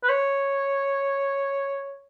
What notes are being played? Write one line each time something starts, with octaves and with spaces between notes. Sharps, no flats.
B4
C#5